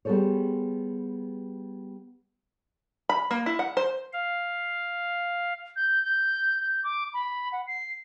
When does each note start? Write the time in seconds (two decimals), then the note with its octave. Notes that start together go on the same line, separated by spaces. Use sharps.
0.05 G3 B3 G#4 A4 C5 C#5
3.09 B5
3.31 A#3
3.46 E4
3.59 F#5
3.77 C5
4.13 F5
5.76 G6
6.03 G6
6.60 G6
6.84 D6
7.14 B5
7.52 F#5
7.67 C7